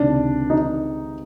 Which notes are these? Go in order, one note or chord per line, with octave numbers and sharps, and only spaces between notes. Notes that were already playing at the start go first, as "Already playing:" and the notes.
Already playing: C#2 C3 D#3 D4
D#4